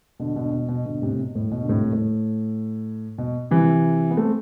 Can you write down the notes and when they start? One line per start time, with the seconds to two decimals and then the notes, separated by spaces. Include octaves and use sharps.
0.20 B2 D3
0.36 B2 D3
0.52 B2
0.69 B2
0.85 B2 D3
1.02 A2 C3
1.20 B2
1.35 A2
1.52 B2
1.62 D3
1.68 A2 C3
1.93 A2
3.18 B2
3.51 C3 E3
4.10 B3
4.17 A3 C4